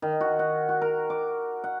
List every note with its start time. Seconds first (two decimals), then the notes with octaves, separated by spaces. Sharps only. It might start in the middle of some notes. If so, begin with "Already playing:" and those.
0.02 D#3
0.21 F#4
0.39 F#5
0.69 F#4
0.81 A#4
1.10 D6
1.64 F#5